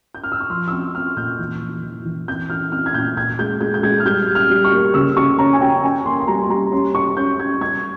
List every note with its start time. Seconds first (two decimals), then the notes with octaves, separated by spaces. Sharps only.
0.15 G6
0.24 F6
0.32 E6
0.40 C#6
0.50 F3 C6
0.68 E6
0.72 C4 C#6
0.95 C4 F6
1.16 A#2 G6
1.39 E3
1.61 E3
1.83 E3
2.05 E3
2.28 C4 G6
2.50 E4 F6
2.72 C4 F6
2.86 G#6
2.94 A#2 G6
3.17 A#2 G#6
3.39 G#3 G6
3.61 G#3 G6
3.74 G6
3.83 G#3 G#6
4.00 F6
4.05 G3 G6
4.28 G3
4.35 F6
4.50 G3
4.64 C#6
4.73 A#3
4.94 C#3 E6
5.17 C#3 C#6
5.39 C#4 A#5
5.53 G#5
5.61 C#4 G5
5.83 C#4 G#5
6.06 A#3 C6
6.20 C6
6.27 G3 A#5
6.49 G3 A#5
6.72 C#4 C6
6.94 C#4 C#6
7.17 C#4 G6
7.39 C#4 G#6
7.61 G3 G#6